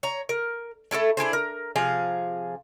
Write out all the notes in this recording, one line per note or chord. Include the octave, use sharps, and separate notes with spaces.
C#5 A#5
A#4
A3 E4 F4 A4
D4 E4 G#4 C5
A#4
C3 F3 G#4 F5